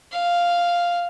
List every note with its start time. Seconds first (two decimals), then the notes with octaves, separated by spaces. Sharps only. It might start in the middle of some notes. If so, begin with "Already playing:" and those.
0.12 F5